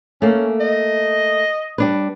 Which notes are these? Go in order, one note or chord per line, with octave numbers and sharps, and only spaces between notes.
A3 A#3 C#4
D#5
G3 D4 B4